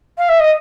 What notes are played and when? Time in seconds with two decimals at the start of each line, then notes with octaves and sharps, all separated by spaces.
0.18 F5
0.28 E5
0.39 D#5